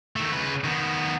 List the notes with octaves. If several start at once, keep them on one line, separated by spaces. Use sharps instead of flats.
D#3 A3
C#3 B4
D#3 B3